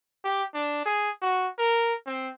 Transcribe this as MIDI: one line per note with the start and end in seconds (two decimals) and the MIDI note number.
0.25 0.43 67
0.54 0.85 62
0.86 1.10 68
1.22 1.48 66
1.59 1.94 70
2.07 2.31 60